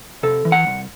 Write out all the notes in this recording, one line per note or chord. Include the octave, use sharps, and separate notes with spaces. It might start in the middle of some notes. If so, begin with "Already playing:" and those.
C3 A4
E3
F#5
C2